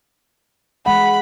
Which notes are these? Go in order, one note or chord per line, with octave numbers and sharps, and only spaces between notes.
E3 G#3 F#5 B5